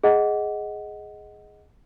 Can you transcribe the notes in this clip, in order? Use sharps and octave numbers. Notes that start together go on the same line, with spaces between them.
G#4 D#5 F#5